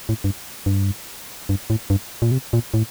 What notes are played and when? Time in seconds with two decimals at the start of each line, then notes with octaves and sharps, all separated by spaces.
0.09 A2
0.24 G2
0.66 G2
1.49 G2
1.70 A2
1.90 G2
2.22 A#2
2.32 C3
2.53 A#2
2.74 A2